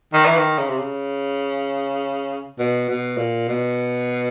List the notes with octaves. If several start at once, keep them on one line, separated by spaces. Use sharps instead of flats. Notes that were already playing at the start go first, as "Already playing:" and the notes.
D#3
E3
D#3
C#3
C3
C#3
B2
B2
A#2
B2